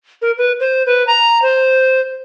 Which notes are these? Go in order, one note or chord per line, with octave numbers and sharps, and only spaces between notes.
A#4
B4
C5
B4
A#5
C5